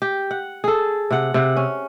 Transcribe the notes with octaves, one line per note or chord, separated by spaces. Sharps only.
G4
F#5
G#4 A4
C3 F#5
C3 F#5
C#4